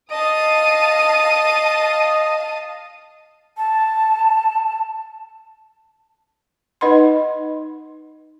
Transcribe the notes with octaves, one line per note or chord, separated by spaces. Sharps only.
D#5 F5 A5 D#6 D#7
A5
D#4 B4 D#5 F#5 B5 C6